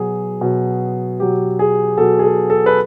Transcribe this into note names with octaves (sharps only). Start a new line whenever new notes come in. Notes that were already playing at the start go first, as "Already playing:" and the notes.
Already playing: B2 F#3 G#4
B2 F#3
B2 F#3 G4
G#4
B2 F#3 A4
G#4
A4
A4
B4